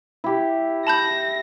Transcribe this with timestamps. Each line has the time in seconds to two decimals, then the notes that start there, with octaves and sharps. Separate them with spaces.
0.24 E4 G4
0.87 A5 B5 G6 A#6